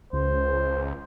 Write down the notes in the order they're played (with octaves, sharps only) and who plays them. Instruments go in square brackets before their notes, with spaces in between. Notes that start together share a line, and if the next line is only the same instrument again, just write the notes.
[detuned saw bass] C#2 [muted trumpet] C5